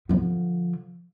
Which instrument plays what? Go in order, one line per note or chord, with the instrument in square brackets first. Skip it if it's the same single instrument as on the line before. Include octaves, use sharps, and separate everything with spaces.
[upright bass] D3 F3